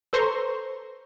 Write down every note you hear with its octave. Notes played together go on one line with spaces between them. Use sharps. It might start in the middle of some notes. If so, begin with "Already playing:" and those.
A4 B4 C5 A#5 C6 C#6